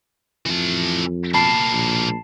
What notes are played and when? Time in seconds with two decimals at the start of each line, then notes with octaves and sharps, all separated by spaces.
0.46 F2 E3 A5
1.34 B2 A#3 A5 B5 C7
1.72 A#1